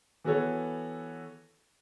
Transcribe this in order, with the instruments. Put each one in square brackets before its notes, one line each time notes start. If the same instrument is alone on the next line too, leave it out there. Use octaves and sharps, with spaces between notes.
[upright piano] E3 B3 F#4 A4 C#5